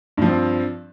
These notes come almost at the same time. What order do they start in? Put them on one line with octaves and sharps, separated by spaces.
G2 F3 C4